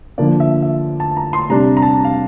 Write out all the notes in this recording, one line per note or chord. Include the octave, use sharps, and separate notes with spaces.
D3 F3 A#3 D4 D5
E5
E5
A5
A#5
C6
C3 G3 D4 A#5
A#5
A5
F5